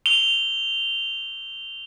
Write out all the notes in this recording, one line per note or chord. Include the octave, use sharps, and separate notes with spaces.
F7 G7